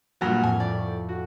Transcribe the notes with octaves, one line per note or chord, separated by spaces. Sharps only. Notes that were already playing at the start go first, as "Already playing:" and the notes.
G2 A#2 F#3 F#5 F6
F2 A2 G#5
D5 G5
C#6
F#4